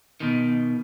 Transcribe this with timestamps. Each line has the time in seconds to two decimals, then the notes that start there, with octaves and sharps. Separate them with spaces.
0.20 B2 D#3